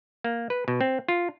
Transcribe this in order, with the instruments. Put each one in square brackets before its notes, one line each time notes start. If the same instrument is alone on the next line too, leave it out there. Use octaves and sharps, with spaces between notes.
[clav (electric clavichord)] A#3
B4
B2
C4
F4